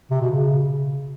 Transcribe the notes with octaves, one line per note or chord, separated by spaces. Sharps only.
C3
B2
C#3